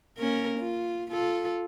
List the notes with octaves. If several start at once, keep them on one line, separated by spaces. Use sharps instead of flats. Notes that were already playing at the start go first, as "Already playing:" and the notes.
A#3 C#4 A#4
F4
F4 A4